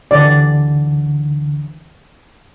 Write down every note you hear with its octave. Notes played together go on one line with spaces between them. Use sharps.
D2 D3 E3 D5